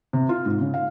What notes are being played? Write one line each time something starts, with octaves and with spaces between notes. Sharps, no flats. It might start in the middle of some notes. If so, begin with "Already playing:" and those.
C3
F4
G#2
C#3
F5